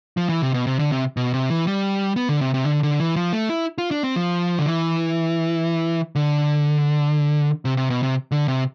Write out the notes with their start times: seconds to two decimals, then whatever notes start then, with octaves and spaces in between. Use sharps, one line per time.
0.17 F3
0.29 E3
0.42 C3
0.54 B2
0.67 C3
0.79 D3
0.92 C3
1.17 B2
1.34 C3
1.50 E3
1.67 G3
2.16 B3
2.29 D3
2.41 C3
2.54 C3
2.66 D3
2.83 D3
3.00 E3
3.16 F3
3.33 A3
3.49 E4
3.78 F4
3.91 D4
4.03 C4
4.16 F3
4.59 D3
4.66 E3
6.15 D3
7.65 C3
7.77 C3
7.90 B2
8.03 C3
8.31 D3
8.48 C3